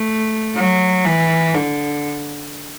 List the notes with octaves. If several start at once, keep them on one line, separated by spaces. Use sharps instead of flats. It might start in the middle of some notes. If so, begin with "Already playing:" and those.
Already playing: A3
F#3
E3
D3